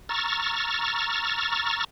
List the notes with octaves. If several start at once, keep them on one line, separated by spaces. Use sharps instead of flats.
A#5 C#6 E6 F6 A6